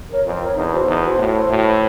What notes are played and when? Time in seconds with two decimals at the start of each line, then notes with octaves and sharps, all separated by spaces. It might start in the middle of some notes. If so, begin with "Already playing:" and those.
0.09 A#4 C#5
0.25 F2 F4
0.41 A#4 C#5
0.56 E2 D#4
0.72 F#4 A4 C5
0.87 E2 D#4
1.04 F#4 A4 C5
1.18 A2 F#4
1.34 A4 C5
1.49 A2 F#4
1.66 A4 C5